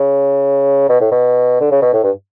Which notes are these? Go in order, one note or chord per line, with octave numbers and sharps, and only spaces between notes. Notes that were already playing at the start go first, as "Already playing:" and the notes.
Already playing: C#3
B2
A2
B2
D3
C#3
B2
A2
G2